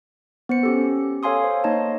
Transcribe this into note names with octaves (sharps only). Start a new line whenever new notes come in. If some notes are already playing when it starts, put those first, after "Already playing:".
B3 C5 C#7
C#4 G4 A4
A4 C#5 F5 G#5 C6 D#6
C5
A#3 D#4 C#5 D#5 A5